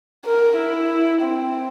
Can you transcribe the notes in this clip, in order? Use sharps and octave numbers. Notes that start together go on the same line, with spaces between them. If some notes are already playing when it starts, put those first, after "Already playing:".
A#4
E4
C4